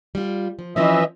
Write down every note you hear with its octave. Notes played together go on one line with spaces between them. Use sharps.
G3 F4
F3
E3 F3 C4 C#4 D#5 E5